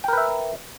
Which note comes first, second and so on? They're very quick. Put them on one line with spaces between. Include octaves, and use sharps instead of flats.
G5 A#4 B4 E5